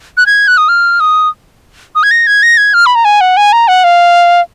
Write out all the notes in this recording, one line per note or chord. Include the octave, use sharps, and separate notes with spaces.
F#6
G#6
F#6
D#6
F6
D#6
D#6
G#6
A#6
G#6
A#6
G#6
F6
B5
A#5
G#5
F#5
G#5
A#5
F#5
F5